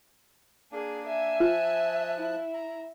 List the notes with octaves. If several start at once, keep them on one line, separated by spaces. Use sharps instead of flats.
A#3 D4 G#4
E5 G#5
F3 F4 A5 F#6
E4
A#5